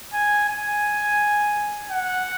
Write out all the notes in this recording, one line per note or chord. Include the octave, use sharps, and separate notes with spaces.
G#5
G#5
F#5